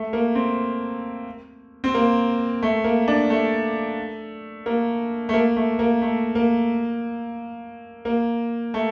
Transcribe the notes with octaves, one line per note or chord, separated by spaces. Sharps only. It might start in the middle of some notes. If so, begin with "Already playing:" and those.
Already playing: A3
A#3
C4
C4
A#3
A3
A#3
D4
A3
A#3
A3
A#3
A3
A#3
A3
A#3
A#3
A3